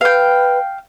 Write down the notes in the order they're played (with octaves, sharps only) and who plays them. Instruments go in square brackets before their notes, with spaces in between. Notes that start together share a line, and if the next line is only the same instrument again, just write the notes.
[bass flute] B4 [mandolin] F5 G5